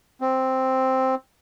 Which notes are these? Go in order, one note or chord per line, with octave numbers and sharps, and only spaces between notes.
C4